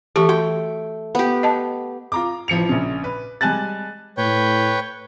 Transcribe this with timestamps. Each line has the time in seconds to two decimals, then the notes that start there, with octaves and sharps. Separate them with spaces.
0.16 E3 A3 G4
0.29 F#4 G5
1.15 B3 G4
1.43 D#5 A5
2.12 F4 A#5 D6
2.48 A1 F3 C#7 F7
2.69 A#1 C#3
3.04 B4
3.41 G3 G#3 G#5 A5 F#6 A6
4.17 A2 B4 C#5 G5